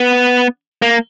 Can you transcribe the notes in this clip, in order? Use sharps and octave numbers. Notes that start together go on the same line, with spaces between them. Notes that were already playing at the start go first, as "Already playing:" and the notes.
Already playing: B3
A#3